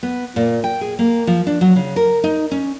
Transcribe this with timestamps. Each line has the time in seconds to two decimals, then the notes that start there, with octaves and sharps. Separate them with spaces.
0.03 B3
0.36 A#2
0.64 G5
0.81 G#4
0.99 A#3
1.27 F3
1.47 D4
1.61 F#3
1.76 C#3
1.96 A#4
2.24 D#4
2.51 C#4